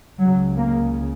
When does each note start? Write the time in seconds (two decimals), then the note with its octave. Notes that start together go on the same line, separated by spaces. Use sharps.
0.19 C#2 C#3 F#3
0.57 A#3